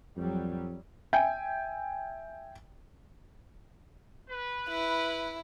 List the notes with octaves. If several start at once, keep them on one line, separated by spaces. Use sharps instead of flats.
F2 F#3 G3
E5 G5 G#5
B4
E4